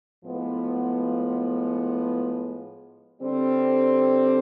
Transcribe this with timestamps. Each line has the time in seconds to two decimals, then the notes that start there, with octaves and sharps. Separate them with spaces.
0.24 A2 F3 G#3 B3
3.20 D3 G3 C4